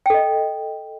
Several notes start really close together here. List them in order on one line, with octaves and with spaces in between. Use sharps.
G5 A4 D#5